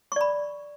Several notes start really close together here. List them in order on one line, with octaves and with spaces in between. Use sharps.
C#6 D5 B5